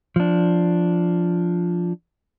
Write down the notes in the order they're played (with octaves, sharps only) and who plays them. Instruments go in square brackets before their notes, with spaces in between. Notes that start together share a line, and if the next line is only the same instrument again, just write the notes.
[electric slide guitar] F3 D4